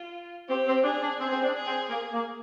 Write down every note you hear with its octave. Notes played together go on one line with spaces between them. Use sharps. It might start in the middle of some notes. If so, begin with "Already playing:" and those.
Already playing: F4
C4 G4
C4
D4 G#4
D4
C4 G#4
C4
D4
G#4
C4
A#3 G#4
A#3